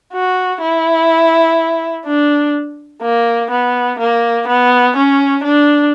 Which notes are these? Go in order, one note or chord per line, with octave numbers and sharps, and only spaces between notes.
F#4
E4
D4
A#3
B3
A#3
B3
C#4
D4